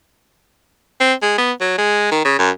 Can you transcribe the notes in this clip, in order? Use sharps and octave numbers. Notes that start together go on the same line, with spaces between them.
C4
G#3
B3
F#3
G#3
D#3
C#3
F#2